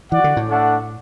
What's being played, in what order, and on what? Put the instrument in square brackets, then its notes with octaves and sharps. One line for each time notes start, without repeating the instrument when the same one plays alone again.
[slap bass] E3 [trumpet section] F#4 D5 F#5
[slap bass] D3
A2
[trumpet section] A3 D4 A4 F#5